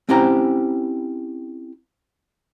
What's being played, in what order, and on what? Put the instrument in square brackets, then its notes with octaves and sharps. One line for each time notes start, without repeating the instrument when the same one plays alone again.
[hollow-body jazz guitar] C4 C#4 E4 G4 C5 A#5